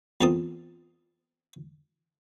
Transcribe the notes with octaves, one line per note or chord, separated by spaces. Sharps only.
E2 A#2 C4 A4 A5 D#6